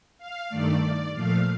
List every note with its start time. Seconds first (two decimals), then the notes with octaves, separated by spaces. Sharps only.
0.18 F5
0.49 G2 D#3 A3 D5
1.13 A#2 F3 A3 F5